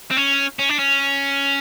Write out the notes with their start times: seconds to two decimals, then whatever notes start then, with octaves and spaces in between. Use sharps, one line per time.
0.11 C4
0.17 C#4
0.59 C#4
0.69 D4
0.79 C#4